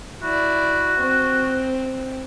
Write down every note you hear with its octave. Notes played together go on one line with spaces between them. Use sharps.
E4 F#4 D5
C4